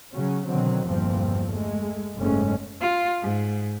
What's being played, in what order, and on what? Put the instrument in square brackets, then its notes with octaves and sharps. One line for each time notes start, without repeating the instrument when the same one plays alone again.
[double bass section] C#3 F#3 C#4
B2 D3 D#3 F#3 C4
G1 E2 A#2 F3 C4
G#3 A3
F#1 G#2 G#3 A3 C#4
[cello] F4
G#2